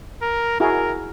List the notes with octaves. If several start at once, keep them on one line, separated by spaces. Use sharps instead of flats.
A#4
E4 F#4 G#4 A#4